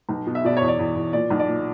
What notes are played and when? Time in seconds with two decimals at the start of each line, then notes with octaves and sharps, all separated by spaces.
0.09 B1
0.27 B2
0.35 E5
0.44 B2 D5
0.57 E2 C#5
0.68 D5
0.79 E2
0.95 E2
1.13 A#2 D5
1.30 B1
1.39 D5
1.47 A#2